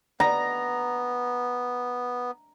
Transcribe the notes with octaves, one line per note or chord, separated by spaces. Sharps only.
B3 A#5